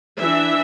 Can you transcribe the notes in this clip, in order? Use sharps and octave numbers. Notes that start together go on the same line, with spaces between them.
E3 D4 E5